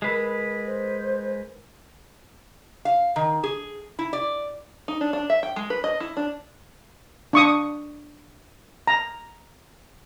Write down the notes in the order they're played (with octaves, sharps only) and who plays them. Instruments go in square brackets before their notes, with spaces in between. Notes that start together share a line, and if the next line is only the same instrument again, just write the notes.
[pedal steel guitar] G#3 B4 [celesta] A#4 B5 C7
[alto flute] C5
[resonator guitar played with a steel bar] F5
D#3
G#4
E4
D5
[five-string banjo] D#4
D4
D4
E5
G5
G#3
B4
D#5
E4
D4
[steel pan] D4 C#6 D#6
A#5